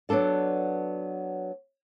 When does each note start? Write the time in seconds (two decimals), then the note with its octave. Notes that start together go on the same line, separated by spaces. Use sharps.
0.09 F#3 B3 D4 A4 D5